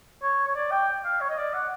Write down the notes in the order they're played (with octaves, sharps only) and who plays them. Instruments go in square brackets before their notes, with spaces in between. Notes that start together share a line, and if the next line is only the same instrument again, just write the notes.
[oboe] C#5
C#5
D5
G5
F5
C#5
D#5
D5
F#5